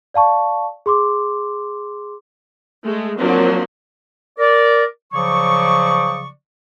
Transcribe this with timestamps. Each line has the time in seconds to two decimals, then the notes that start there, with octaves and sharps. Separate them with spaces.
0.14 D5 F5 A5 C#6
0.86 G#4 C6 D6
2.84 G#3 A3
3.18 F3 F#3 A#3 C4 D4
4.39 A#4 D5
5.13 C#3 F3 F#3 D5 C#6